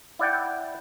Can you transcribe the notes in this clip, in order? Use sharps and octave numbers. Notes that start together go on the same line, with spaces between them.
E4 D5 F#5 G5